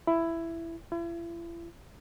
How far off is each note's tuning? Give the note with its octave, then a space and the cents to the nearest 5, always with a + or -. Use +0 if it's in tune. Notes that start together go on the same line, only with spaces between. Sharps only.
E4 +10
E4 +40